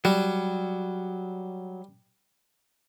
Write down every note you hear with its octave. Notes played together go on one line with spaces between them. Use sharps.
F#3 G3